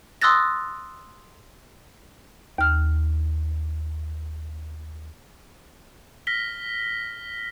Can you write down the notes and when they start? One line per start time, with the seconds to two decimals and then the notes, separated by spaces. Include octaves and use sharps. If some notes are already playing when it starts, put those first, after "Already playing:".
0.22 C6 D#6 E6 F#6 A6 A#6
2.58 D#2 F6
6.27 F6 A#6 B6 G7